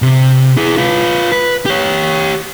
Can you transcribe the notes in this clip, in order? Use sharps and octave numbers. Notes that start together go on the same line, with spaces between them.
C3
E4 G#4
F4 B4
B4
G4 C#5